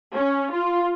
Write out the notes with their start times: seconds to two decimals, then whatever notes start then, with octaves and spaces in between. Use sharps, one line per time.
0.14 C#4
0.53 F4